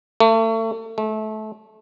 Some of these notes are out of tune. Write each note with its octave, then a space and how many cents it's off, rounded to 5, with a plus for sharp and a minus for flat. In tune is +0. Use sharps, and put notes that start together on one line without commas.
A3 +35
A3 -25